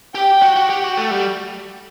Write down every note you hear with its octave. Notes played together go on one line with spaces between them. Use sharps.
G4 G5
F#4
F#4
G4
F#4
A3
G3